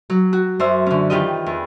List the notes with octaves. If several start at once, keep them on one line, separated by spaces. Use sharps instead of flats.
F#3
F#4
F#2 C5 E5
D3 C#4
D#3 E3 F4 G4 A#4 D#5
E2